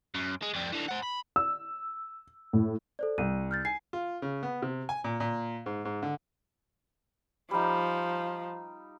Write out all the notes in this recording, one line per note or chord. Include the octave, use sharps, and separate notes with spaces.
F#2
G#3
F2 G3
D3 E3
C5 F#5
B5
E6
A2
A4 C5 D5
C2 D#7
F6 G6 A6
G#5 C7
F4
C#3
B3
C3
G#5
A#2
A#2
G#2
G#2
D3
F3 G3 D#4